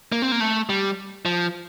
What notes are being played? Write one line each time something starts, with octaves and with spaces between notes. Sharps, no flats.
A#3
C4
A#3
A3
G3
F3